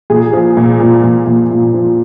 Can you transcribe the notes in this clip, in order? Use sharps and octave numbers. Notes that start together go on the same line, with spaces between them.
A#2 G#4
F3
A#2
A#2
A#2
A#2
A#2
F3